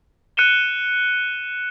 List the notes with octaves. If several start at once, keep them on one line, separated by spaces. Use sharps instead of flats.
F#6 C#7 D#7 E7 G7